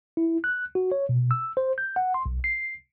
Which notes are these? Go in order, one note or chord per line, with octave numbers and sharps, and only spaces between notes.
E4
F#6
F#4
C#5
B2
E6
C5
G6
F#5
C6
B1
C7